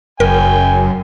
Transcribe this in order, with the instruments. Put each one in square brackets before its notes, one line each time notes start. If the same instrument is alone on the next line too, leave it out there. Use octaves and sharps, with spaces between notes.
[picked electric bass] F#1 [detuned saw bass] F#2 [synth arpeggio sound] A#4 [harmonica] G5 G#5